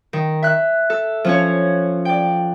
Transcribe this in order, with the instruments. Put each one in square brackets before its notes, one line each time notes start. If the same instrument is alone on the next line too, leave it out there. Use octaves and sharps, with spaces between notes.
[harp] D#3
E5 F#6
A4
F3 C#4 C#5
D5 G5